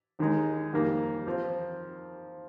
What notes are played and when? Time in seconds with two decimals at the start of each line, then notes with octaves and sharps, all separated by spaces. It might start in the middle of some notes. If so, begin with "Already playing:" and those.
0.19 D#2 D#3 G#3 D#4
0.73 F2 D#3 G3 A#3
1.27 F3 C4